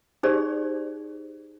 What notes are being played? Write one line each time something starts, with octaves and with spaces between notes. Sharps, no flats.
D#4 G4 G#4 C5 D5